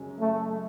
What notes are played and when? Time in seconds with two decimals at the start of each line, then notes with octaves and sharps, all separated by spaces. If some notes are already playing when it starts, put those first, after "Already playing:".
Already playing: F#2 C#3 G#3 C#4
0.20 A3